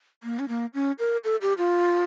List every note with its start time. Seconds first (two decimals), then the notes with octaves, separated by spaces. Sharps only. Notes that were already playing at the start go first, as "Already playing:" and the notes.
0.23 A#3
0.39 C#4
0.48 A#3
0.74 C#4
0.99 A#4
1.24 A4
1.42 G4
1.58 F4